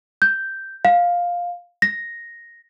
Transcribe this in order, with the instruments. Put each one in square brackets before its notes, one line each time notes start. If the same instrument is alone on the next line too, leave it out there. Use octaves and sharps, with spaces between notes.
[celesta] G6
F5
A#6